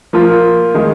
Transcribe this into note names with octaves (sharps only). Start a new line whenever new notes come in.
F3 A#3 F4
D#3 G#3 D#4 G#4